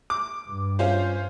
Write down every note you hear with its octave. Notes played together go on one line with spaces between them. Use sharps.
D6
G2
C#4 F4 C5